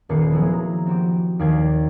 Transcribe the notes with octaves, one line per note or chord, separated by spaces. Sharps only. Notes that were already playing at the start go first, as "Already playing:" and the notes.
D#1 A#3 B4 C7 C#7
F3 F#3 G#3 B3 E4 G#4
A#5
C4 F#4 G4
D#2 D5 F5 G5 G#6 C7